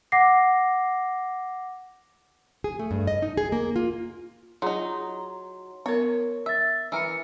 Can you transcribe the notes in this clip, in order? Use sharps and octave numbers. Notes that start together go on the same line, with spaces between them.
F#5 D6 A#6 C7
G#4
A3
G2
D#5
D#4
G#4
A#3
F4
F#3 D#4 F4 G#4 A#5 C6
B3 A#4 C#5
E5 E6 A6
E3 A#4 E6 C#7